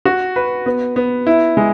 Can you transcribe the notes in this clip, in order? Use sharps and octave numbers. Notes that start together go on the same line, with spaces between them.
F#4
B4
B3
B3
E4
G#3